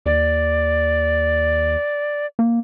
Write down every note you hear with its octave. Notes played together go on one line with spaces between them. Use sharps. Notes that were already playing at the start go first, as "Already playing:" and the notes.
D#2 D5
A#3